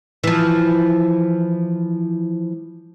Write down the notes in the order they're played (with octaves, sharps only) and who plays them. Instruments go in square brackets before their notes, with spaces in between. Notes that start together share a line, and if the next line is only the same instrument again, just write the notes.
[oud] E3 F3